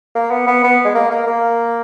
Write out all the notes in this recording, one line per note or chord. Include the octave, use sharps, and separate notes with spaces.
A#3
B3
B3
B3
G#3
A#3
A#3
A#3